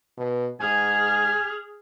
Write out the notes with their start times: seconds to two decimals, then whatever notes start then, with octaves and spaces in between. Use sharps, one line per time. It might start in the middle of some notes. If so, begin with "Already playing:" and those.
0.17 B2
0.61 G#2 G#4 G#5 F6